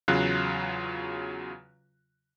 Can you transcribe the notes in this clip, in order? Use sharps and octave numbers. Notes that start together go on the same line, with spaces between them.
E2 C#3 F#3 F4 F#6